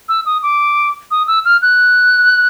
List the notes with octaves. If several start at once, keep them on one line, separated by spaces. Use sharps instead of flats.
E6
D#6
D6
D#6
E6
F6
F#6